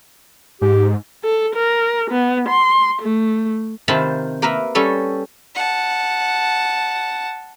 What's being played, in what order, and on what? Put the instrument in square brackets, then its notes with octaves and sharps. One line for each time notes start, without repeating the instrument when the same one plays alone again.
[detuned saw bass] G#2 [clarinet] G4
[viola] A4
A#4
B3
C6
A3
[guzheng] C3 D#3 F4 C5 A5 B5
A#3 A#4 B4 E5
G3 C#4 A4
[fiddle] F#5 A5